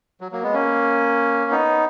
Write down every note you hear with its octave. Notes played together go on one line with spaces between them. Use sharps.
F#3
F#3 A#3
G#3 B3
A#3 C#4
B3 D#4